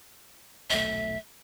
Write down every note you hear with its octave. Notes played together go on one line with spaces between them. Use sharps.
D#1 B1 A3 E5